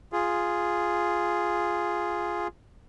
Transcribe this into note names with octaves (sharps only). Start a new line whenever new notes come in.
F4 G#4